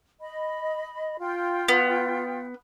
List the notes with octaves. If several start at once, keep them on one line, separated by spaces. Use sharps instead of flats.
D#5 B5
F4 G5
B3